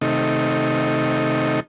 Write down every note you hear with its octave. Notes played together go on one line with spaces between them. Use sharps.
C3 D#3 A3 D#4